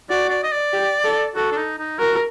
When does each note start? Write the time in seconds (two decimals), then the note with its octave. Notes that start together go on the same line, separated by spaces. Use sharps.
0.09 F#4 D5
0.30 D5
0.44 D#5
0.52 D5
0.73 G4
1.04 A4
1.36 F#4 A4
1.52 D4
1.57 D#4
1.79 D#4
1.99 F#4 A#4